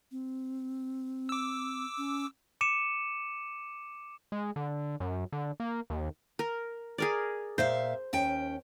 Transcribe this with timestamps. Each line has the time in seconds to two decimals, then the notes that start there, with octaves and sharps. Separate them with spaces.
0.12 C4
1.29 D6 E6
1.98 C#4
2.61 D6 C#7 D#7 E7
4.32 G#3
4.56 D3
5.00 F#2
5.32 D3
5.60 A#3
5.90 D#2
6.39 A#4
6.98 G#4 A#4 D5
7.58 A#2 C5 E5 F5
8.13 D#2 C#4 G5